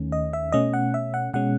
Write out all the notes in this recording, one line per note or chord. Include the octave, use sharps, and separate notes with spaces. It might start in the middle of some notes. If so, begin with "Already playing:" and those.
Already playing: D#2 D#3 A3 C#4
D#5
E5
B2 A3 C#4 D#5
F#5
E5
F#5
B2 G#3 C#4 F#5